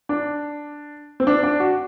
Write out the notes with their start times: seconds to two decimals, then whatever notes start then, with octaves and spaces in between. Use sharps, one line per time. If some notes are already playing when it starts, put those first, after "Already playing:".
0.09 D4
1.20 C4
1.27 D4
1.44 D4
1.60 F#4